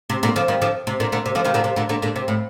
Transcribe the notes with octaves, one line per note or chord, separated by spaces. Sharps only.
C3
A#2 D3
D3 F3
D#3 G3
D3 F3
C3
A#2 D3
A#2 D3
C3
D3 F3
C3 D#3
A#2 D3
C3
A#2 D3
A#2 D3
A#2 D3
C3
A2